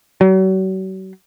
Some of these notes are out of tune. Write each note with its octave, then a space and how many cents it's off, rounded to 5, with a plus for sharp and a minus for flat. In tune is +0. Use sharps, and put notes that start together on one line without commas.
F#3 +40